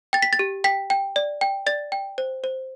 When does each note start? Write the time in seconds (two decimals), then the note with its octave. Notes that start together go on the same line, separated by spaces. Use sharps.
0.13 G5 A6
0.22 B6
0.33 A6
0.39 G4
0.64 G5 B6
0.90 G5
1.16 D5
1.41 G5
1.67 D5 A6
1.92 G5
2.18 C5
2.44 C5